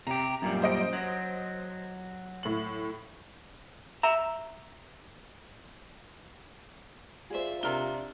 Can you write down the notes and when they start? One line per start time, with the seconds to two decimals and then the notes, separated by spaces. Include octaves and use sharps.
0.07 C3 G4 A#5
0.42 F#2 A#2 G3
0.62 C5 D#5 D7
0.93 F#3
2.43 A2 F#7
4.03 E5 A#5
7.30 F4 G#4 C5 D5 E5
7.63 C3 D4 A#4 D5 A#5 G7